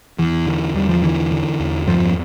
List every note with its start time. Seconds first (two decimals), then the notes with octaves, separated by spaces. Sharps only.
0.18 E2 E3
0.47 D3
0.75 E2 G3
0.89 F3
1.03 D3 E3
1.32 D3
1.60 E2
1.87 G2 F3